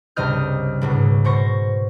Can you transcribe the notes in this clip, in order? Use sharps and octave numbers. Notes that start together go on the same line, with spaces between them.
C#2 G2 C3 D#5 F6 G6
C#2 G#2 B2
B2 C5 C#6 A#6